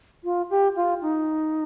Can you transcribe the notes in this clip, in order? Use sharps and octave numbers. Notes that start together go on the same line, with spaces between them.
F4
G4
F4
D#4